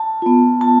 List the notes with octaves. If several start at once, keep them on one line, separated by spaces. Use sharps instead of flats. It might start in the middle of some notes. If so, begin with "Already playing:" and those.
Already playing: A5
B3 F4
A5